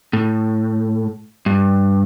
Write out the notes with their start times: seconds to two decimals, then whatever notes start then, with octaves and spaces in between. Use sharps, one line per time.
0.13 A2
1.46 G2